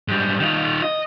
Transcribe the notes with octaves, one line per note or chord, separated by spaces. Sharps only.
G#2 G3
D#3 F4
D#5